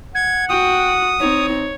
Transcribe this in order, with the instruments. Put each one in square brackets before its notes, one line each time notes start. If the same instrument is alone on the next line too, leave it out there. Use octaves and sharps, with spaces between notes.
[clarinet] F#5 [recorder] G#6
[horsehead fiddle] F#4 [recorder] G5 [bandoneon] D#6
[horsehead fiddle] C4 D#4 [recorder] C#5